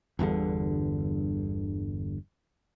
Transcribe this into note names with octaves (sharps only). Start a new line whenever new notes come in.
G1 E2 G2 D3